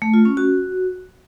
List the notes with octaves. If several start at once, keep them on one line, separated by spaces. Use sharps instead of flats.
A3
F4
C#4
F#4